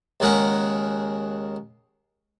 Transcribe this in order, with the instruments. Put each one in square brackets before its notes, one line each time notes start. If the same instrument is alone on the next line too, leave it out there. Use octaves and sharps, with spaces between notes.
[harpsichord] D#2 C#3 G#3 A#4 F#5